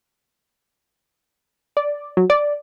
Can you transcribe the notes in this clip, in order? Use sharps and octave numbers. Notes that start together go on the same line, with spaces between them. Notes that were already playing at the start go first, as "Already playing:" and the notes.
D5
F#3
D5